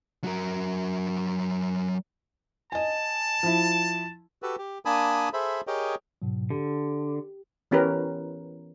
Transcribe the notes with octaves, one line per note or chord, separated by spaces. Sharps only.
F#3 A#4
D#5 G#5 A5
F3 E4
F#4 G4 A4 B4
G4
A#3 D4 G#5 A5 B5 D#6
G#4 A4 C5 E5 B5
G4 G#4 A#4 C#5 D#5 G5
G#2 B2 F#3
D3 G4
E3 B3 C#4 G4 A#4 B4